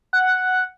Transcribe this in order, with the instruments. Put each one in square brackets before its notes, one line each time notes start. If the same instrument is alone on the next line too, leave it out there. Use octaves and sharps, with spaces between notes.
[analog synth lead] F#5